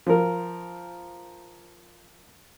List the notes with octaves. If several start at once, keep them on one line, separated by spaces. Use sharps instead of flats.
F3 A#4